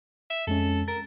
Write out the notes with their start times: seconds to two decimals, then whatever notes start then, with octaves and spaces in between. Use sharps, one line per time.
0.30 E5
0.47 F2 G#3 C#4 A4
0.88 A#4 A6